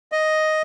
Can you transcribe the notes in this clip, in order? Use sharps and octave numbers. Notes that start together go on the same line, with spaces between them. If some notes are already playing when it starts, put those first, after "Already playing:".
D#5